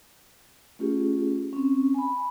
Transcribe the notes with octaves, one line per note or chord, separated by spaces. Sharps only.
A3 C#4 F4 G4 G#4
C4 C#4
G#5 B5